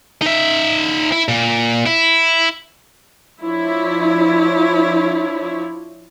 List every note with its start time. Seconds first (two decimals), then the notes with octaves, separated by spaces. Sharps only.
0.22 D#4 E5
1.12 E4
1.29 A#2
1.86 E4
3.42 F3 D4 E4 C#5